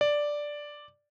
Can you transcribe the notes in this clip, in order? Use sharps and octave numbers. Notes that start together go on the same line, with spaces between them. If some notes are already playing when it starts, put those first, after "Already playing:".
D5